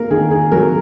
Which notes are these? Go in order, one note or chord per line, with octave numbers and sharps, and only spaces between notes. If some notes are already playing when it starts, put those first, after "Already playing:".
Already playing: A#3 A#4
D#3 G#4
G#4
F#3 A#4